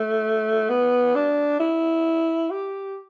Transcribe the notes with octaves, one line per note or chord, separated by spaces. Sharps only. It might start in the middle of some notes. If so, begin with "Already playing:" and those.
Already playing: A3
B3
D4
E4
G4